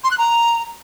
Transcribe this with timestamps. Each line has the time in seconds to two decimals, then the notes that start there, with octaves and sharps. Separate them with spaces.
0.04 C6
0.11 F#6
0.18 A#5